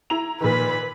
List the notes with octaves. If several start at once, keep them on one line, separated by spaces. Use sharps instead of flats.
E4 A#5 F7
A#2 D#3 B4 B5